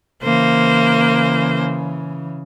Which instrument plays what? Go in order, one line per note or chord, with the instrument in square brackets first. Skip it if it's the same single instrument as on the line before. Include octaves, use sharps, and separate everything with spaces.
[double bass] C#3 E3 [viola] A#3 C5